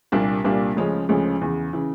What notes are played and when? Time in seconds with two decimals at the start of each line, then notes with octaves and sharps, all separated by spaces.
0.12 C2 A#2 G3 A#3 D4
0.44 C2 A#2 G3 A#3 D4
0.76 D2 C#3 F3 G#3 C#4
1.09 D2 C#3 F3 G#3 C#4
1.41 E2 C#3 E3
1.73 C#3 E3